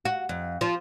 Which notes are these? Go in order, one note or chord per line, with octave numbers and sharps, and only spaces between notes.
F#4
F2
F3